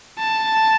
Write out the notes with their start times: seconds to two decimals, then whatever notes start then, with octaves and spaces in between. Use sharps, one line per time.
0.19 A5